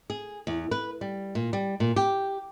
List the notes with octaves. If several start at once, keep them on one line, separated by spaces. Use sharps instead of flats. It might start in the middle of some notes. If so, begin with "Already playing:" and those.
G#4
E2
B4
G3
A#2
G3
A#2
G4